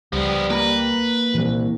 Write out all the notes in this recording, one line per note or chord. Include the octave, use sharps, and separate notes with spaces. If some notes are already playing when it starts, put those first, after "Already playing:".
C#2 F3 G3 B3
A#3 B4 A#5
C2 A#2 E3